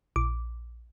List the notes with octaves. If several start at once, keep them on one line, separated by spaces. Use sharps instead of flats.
A#1 D6